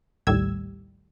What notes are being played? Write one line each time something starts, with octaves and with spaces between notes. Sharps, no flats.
A#1 D#2 A2 G3 E6 G#6